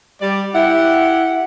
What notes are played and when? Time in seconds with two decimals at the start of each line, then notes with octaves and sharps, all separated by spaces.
0.21 G3 D5
0.55 E4 G4 F#5